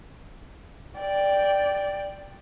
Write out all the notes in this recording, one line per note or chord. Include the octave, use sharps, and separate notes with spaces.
D5 G5